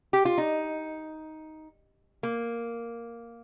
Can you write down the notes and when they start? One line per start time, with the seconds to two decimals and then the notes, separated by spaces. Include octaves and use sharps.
0.13 G4
0.25 F4
0.38 D#4
2.23 A#3